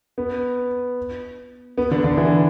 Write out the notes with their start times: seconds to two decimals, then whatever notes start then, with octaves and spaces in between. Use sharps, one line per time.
0.18 B3
1.78 B3
1.91 D3 D4
2.04 D3 D4
2.17 E3 E4